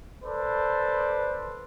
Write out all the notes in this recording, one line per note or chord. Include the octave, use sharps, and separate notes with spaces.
A4 B4 C5 D5